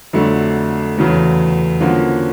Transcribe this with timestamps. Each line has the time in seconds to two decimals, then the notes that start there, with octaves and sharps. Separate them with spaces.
0.13 F2 D3 F#3 A3 D4
0.97 E2 C#3 F#3 A3
1.81 D3 F3 A#3 C#4 F#4